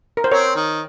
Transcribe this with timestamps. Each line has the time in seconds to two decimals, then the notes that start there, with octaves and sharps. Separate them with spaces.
0.17 A#4
0.24 C5
0.32 C4 A#4 C#5
0.55 D#3